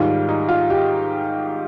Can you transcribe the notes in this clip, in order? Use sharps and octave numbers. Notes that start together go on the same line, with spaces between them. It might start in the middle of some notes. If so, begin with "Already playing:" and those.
Already playing: G#2 D#3 G3 F4
D#4
F4
G4